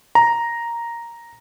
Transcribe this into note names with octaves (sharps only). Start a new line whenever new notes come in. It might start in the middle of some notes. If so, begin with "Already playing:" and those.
A#5